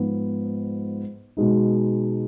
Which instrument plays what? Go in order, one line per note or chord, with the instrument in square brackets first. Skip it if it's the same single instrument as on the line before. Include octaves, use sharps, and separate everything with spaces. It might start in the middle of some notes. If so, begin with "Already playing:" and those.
Already playing: [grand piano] G#2 F3 B3
B2 G#3 D#4